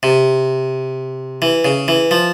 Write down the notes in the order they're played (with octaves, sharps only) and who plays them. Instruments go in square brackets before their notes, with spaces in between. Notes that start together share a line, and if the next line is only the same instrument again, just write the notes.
[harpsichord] C3
E3
C#3
E3
F3